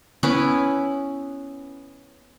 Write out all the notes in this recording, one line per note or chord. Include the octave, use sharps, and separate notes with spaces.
B3 C#4 E4 B4